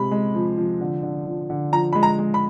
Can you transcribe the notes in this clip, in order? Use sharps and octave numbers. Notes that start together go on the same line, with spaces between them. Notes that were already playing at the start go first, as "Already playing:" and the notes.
Already playing: C3 G#3 B5
G#3
F3
F3
D3
D3
F3
D3
F3 A#5
G#3 B5
A#5
G#3
B5